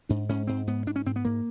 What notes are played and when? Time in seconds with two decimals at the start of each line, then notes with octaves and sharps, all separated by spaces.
0.09 G#2 D4
0.29 G#2 C#4
0.47 G#2 C4
0.67 G#2 B3
0.86 G#2 D4
0.96 C#4
1.06 G#2 C4
1.16 B3
1.25 G#2 A#3